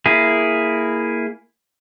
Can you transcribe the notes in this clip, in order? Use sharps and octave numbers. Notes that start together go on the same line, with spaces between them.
A#3 E4 G#4